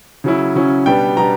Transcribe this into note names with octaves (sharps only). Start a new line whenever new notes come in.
C#3 F#3 C#4 E4
C#3 F#3 C#4 E4
B2 G3 B3 D4 G5
B2 G3 B3 D4 A#5